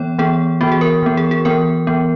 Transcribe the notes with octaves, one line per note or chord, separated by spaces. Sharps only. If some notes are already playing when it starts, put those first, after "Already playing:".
Already playing: E3 B3 C#5
E3 B3 G#4
E3 B3 F#4
G#4
A#4
E3 B3
G#4
G#4
E3 B3 A#4
E3 B3